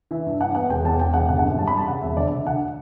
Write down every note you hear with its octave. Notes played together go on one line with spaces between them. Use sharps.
E3 E5
G2
G2 F#5
B3 F#5
E1 G5
E2 A5
E1 G5
E1 F#5
G1 F#5
F#5
F#2
G3 A5
B5
G3 A5
C#3 F#5
E1 E5
D2 D5
D2 E5
D2 F#5